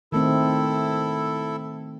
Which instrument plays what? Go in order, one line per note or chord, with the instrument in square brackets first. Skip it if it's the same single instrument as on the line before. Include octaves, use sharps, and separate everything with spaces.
[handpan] D#3 A3 C4 [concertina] E4 A4